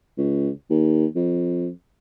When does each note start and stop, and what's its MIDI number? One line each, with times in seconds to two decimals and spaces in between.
0.18 0.50 37
0.70 1.06 39
1.16 1.69 41